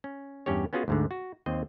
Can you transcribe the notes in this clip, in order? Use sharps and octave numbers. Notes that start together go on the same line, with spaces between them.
C#4
E2 G2 C#4 G4 C#5
B3 C#4 F4 F#4 G#4
D2 G#2 D3
F#4
D#2 C4 C5 D#5